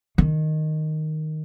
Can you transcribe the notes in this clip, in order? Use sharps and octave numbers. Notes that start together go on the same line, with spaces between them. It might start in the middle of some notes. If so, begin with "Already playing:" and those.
D#3